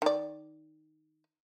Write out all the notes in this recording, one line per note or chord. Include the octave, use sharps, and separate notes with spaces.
D#3 D5